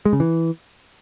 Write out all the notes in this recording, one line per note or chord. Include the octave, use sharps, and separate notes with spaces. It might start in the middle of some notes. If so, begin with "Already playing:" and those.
G#3
C#3
E3